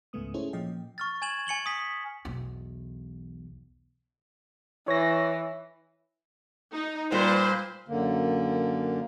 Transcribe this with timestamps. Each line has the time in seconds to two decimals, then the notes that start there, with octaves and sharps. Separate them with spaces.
0.13 C#2 G#2 C#3 A3 B3 D#6
0.34 C#4 E4 G#4 A4 C5 C#5
0.53 A#2 F3 D#5 G5
0.98 C#6 F6 A6
1.22 G#5 G#6 E7 F#7
1.47 G#5 C#7 F#7 G7
1.66 D#6 B6
2.25 B1 E2
4.88 E3 C#5 A#6
6.74 D#4
7.12 A#2 G3 B4 C5
7.88 F#2 D3 A#3